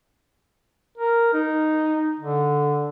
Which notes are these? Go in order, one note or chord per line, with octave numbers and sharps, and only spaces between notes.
A#4
D#4
D3